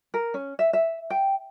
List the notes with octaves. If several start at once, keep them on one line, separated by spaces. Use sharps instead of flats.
A#4
C#4
E5
E5
G5